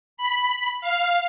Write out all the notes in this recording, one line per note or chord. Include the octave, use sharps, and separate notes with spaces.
B5
F5